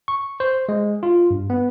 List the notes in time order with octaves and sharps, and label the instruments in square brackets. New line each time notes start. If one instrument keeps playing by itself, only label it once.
[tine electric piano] C#6
C5
G#3
F4
G2
B3